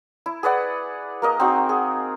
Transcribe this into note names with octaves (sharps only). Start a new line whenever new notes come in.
E4
G#4 B4 D5 F#5
A#3 A#4 D#5
C4 D#4 F#4
G#4